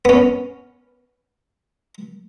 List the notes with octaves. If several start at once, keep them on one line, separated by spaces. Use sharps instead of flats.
B3 C#4